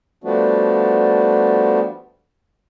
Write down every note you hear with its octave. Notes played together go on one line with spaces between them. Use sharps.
F3 G3 A3 B3 D4 F#4